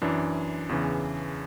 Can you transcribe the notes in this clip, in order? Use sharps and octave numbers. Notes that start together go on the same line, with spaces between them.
F#2 E3 D4
E2 C#3 E3